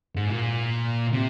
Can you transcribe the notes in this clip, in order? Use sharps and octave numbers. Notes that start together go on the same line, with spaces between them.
G#2
A#2
C3